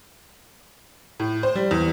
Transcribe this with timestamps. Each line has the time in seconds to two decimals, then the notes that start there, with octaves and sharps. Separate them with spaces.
1.20 A2
1.43 C5
1.55 G3
1.71 E2